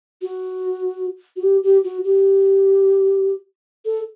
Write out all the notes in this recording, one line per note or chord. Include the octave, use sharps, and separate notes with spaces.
F#4
F#4
G4
G4
F#4
G4
A4